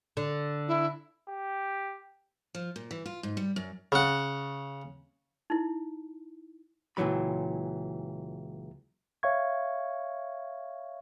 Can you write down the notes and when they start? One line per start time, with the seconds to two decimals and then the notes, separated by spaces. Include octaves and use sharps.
0.17 D3
0.68 E4
1.29 G4
2.55 F3
2.76 A#2
2.91 E3
3.06 F4
3.23 G#2
3.37 G3
3.56 F#2
3.92 C#3 F#5
5.50 D#4 E4
6.97 C#2 A#2 E3 F#3 B5
9.23 C#5 E5 F5 C#6 G#6